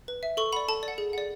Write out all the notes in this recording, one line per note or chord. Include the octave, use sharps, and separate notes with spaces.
B4
E5
A4 C#6
D5 F#5 B5
A4 A5
D5
F#5
G#4
D5 F#5